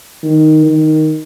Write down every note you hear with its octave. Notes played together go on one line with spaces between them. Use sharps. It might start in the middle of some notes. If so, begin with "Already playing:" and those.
D#3
D#3